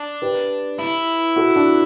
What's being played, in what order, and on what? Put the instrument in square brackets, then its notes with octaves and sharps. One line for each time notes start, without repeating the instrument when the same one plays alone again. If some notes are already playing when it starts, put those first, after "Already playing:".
Already playing: [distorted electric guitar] D4
[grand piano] G4 B4
[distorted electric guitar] E4
[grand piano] F#4 A4
D4 F#4